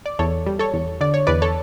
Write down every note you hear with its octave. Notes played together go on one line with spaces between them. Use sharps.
D5
E2 A4 C#5
G3
A4 C#5
E2
D3 D5
C#5
E2 B4 D5
A4 C#5